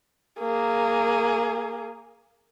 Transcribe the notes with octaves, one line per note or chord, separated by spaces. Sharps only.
A#3 G#4